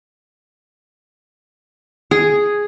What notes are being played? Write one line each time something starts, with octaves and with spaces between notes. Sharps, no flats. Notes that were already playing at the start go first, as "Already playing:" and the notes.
G#4